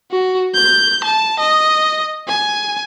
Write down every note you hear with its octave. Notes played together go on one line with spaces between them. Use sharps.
F#4
G6
A5
D#5
G#5